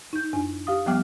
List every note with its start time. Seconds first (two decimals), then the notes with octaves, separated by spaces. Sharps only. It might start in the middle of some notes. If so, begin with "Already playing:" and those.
0.13 D#4 G6
0.33 F#2 D4 G#5
0.67 G4 F5 D#6
0.86 F3 G3 B3 G5 D6 F6